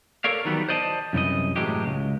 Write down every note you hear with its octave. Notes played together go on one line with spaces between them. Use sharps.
A4 A#4 C#5 D5 F5
D#3 E3 F#3 G3 B3
C5 D5 D#5 F5 A5
C2 F#2 B2 E3 D#5
A2 E3 F#3 G#3 G4
C#2